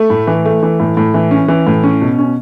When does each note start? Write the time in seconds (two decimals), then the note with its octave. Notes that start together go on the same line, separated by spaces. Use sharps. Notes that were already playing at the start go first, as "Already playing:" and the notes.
Already playing: A3
0.10 A2
0.27 E3
0.45 A3
0.63 E3
0.80 A2
0.97 A2
1.14 E3
1.31 C#4
1.48 E3
1.67 A2
1.83 C#4
2.01 B2
2.19 C#4